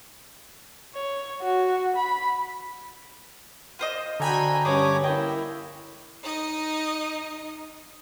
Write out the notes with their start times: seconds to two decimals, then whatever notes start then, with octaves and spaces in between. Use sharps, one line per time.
0.95 C#5
1.42 F#4
1.96 B5
3.79 F4 C5 D#5
4.20 D3 F#4 G5 G#5 A#5 B5
4.65 G2 C#4 G#4 C#5 D6 D#6
5.04 A#3 E4 D#5 G5
6.23 D#4 D#5